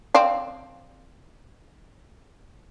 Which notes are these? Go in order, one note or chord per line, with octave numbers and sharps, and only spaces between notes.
C4 D5 F5